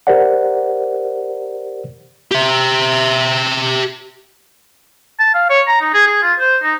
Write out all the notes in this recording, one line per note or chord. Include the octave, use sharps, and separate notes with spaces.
G4 A#4 C5 D5 F#5
G4 E5
A5
F5
C#5
A#5
D#4
G#4
G#4
F4
C5
D#4